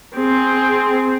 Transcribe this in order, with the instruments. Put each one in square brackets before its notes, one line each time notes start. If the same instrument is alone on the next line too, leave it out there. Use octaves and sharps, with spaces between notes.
[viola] C4 G#4